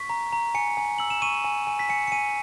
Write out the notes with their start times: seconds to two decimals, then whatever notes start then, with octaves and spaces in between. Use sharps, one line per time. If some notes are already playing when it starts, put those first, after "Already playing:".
Already playing: C#6 B6
0.10 A#5
0.33 A#5
0.55 G#5 C#7
0.77 G#5
0.98 E6 F#7
1.10 E7
1.22 C#6 D#7
1.45 G#5
1.67 G#5
1.79 B6
1.89 G#5 C#7
2.08 C#7
2.12 G#5 D#7